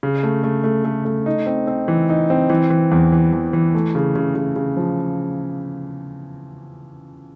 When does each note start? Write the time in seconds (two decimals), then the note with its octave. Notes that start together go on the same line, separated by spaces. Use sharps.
0.03 C#3
0.23 A3
0.44 A3
0.64 A3
0.85 A3
1.05 A3
1.26 D#4
1.46 C4
1.67 C4
1.88 E3
2.09 D#4
2.30 C4
2.50 E3
2.70 E3
2.91 E2
3.12 E3
3.32 E2
3.53 E3
3.74 A3
3.95 C#3
4.16 C#3
4.35 C#3
4.56 C#3
4.77 F3